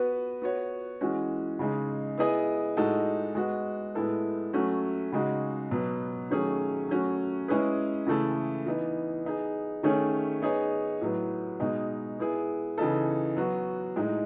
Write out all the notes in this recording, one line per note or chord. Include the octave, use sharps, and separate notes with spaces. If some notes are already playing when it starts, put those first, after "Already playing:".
Already playing: B3 F#4 B4
B3 F#4 C#5
E3 G#3 C#4 F#4
C#3 G#3 D#4
B3 E4 G#4 D#5
A2 G#3 D#4 F#4 A4
G#3 B3 F#4
A2 G#3 B3 E4 A4
F#3 A3 C#4 F#4
C#3 G#3 D#4 F#4
B2 F#3 B3
D#3 F#3 A3 C#4 G#4
F#3 A3 C#4 F#4
G#3 C#4 E4 G#4 B4
C#3 E3 A3 E4 A4
E3 B3 D#4
B3 D#4 G#4
D#3 A3 C#4 G#4 C#5
B3 D#4 G#4 C#5
A2 F#3 B3
B2 G#3 D#4
B3 E4 G#4
C#3 E3 B3 D#4 A4
F#3 B3 F#4
A2 G#3 D#4